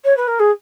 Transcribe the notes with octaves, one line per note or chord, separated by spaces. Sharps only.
C#5
B4
A#4
G#4